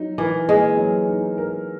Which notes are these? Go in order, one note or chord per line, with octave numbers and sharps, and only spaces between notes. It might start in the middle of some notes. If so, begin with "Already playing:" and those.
Already playing: F#3 D#4
E3 A#4
G#3 A#3
F#3
D#4
A#4